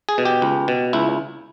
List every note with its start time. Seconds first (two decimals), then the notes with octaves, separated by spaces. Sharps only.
0.09 G#4
0.18 B2
0.25 G4
0.42 C#2
0.68 B2
0.93 C#2 E4